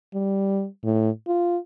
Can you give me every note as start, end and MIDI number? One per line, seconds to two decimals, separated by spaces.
0.14 0.66 55
0.84 1.10 45
1.27 1.57 65